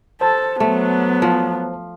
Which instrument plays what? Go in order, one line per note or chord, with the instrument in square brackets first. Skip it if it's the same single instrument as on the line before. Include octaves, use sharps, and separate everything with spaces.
[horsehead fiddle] A4 [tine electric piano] C5 A5
[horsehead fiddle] F#3 B3 [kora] A3
[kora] F3